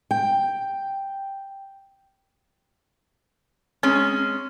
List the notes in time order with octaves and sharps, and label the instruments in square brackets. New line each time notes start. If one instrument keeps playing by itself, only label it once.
[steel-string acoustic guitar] G5
[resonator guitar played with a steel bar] G#3 C#4 [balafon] C4